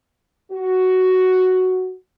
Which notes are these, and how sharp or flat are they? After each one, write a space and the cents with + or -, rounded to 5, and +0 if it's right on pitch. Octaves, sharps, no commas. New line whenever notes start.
F#4 +5